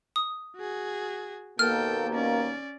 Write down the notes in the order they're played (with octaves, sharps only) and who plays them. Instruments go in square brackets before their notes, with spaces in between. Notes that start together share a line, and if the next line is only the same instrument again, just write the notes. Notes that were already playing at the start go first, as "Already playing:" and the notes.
[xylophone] D#6
[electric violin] F#4 G#4
[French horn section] D#2 B2 A#3 [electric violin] A4 G5 [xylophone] F6
[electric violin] C#4 D5